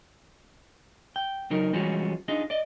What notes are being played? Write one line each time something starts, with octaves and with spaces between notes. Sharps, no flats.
G5
C#3 F#3 D#4 A#4
E3 G3 G#3 C#4 F4 F#4
D4 D#4 F4 G#4 D#5
D5 D#5